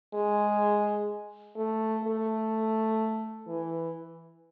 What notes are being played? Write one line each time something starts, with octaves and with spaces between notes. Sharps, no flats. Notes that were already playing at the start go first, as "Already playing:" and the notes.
G#3
A3
A3
E3